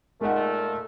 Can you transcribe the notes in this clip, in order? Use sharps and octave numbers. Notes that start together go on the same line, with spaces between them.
A#2 G#3 A3 D#4 A#4 F#5